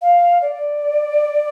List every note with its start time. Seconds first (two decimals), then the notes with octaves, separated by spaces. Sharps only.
0.02 F5
0.42 D5